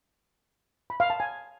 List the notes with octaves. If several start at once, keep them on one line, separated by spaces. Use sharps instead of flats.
B5
F5
A5
G#5